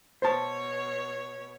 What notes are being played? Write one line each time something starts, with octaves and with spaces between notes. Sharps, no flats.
B2 C5 C#5 A5